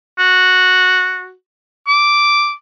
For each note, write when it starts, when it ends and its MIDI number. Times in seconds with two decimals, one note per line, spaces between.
0.19 1.33 66
1.88 2.52 86